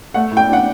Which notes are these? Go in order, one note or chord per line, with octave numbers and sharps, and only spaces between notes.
A3 F#5
A2
G5
D4 F#5